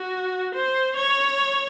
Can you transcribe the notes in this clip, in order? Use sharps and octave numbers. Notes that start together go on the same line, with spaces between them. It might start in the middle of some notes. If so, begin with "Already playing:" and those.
Already playing: F#4
C5
C#5